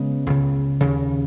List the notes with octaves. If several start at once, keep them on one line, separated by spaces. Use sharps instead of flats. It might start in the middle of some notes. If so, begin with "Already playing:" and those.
Already playing: C#3 G#3 B3
C#2 C#3
D#2 C#3